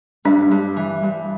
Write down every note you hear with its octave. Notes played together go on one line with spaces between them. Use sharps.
G2 D4
G2
E3
G2